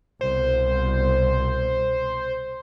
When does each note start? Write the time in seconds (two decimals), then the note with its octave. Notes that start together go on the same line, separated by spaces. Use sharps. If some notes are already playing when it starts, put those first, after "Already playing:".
0.21 C2 B2 C5